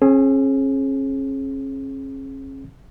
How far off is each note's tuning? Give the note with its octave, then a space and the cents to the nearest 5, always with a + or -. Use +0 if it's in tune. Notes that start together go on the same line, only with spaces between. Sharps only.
C#4 -40 G#4 +15